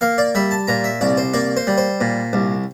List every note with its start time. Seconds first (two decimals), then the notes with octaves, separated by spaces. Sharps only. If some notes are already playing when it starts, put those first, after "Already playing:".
0.01 A#3 F5
0.18 D5
0.35 G3 E5
0.51 A5
0.67 A#2 A#5
0.84 E5
1.01 C2 D5
1.17 C5
1.34 A#3 D5
1.57 C5
1.67 G3
1.78 C5
2.01 A#2
2.33 C2